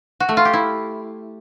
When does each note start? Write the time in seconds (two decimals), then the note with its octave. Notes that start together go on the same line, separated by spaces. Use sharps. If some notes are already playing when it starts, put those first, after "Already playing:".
0.20 F#4
0.29 A3
0.37 F4
0.45 G4
0.53 E4